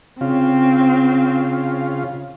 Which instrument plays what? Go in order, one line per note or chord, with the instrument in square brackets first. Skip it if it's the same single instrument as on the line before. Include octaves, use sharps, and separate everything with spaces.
[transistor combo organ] C#3 F4 [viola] C4